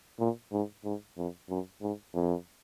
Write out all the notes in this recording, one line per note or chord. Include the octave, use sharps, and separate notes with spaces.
A#2
G#2
G#2
F2
F#2
G#2
F2